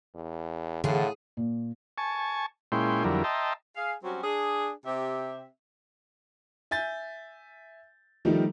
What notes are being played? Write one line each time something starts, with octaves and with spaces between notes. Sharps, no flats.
E2
A2 D3 E3 F4 G#4 F5 F#5
A#2
G#5 A5 C#6
A#2 G#3 C#4 E4 G5 C6
F2 D3 F#3 G3 E4 A#4
D#5 E5 G5 A5 A#5 C6
G#4 F5
F#3 G3 C4 C#4 F#4
D4 G#4
C3 C4 G4 E5
E5 G#5 G6 A6
D#3 F3 G3 A3 D#4